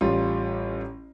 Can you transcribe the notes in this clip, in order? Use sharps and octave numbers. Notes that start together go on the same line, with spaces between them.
A1 G3 F4